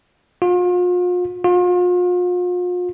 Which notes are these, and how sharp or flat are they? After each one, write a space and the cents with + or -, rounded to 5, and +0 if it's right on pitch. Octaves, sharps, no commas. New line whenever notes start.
F4 +40
F4 +40